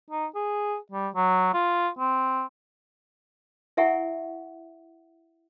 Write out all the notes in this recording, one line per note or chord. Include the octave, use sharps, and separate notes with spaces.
D#4
G#4
G3
F#3
F4
C4
E4 A#4 E5 F#5 G#5 C#6